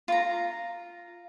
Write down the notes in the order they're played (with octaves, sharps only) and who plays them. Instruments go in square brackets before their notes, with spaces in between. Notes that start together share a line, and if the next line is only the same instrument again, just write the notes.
[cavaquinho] F4 A#5